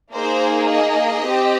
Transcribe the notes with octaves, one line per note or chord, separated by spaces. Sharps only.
A#3 D#4 G#4 C5
D#5
C4 G4